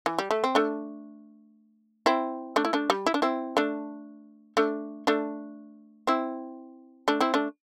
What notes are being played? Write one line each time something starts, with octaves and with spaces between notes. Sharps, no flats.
E3
G3
A3
C4
A3 D4
C4 E4
A3 D4
E4
A3 D4
G3
E4
D4
C4 E4
A3 D4
A3 D4
A3 D4
C4 E4
A3 D4
C4 E4
A3 D4